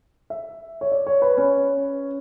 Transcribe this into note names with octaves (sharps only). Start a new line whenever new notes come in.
E5
C#5
D5
C#5
B4
C#4